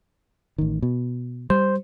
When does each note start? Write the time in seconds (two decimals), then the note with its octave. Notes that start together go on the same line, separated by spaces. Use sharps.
0.58 A1 D#3
0.82 B2
1.50 G3 C5